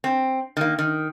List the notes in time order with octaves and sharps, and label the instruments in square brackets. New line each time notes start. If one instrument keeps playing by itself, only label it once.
[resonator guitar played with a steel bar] C4
D#3 A#3
D#3